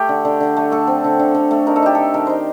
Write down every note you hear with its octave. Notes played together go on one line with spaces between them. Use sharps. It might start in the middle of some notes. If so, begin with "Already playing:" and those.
Already playing: A3 G4
D3
D3
D3
A3
A3 A4
C4
D3
D3
D3
A3
D#4 A#4
A4
D#4 G4
D#3 A4
D#3 A#4
D#4 C5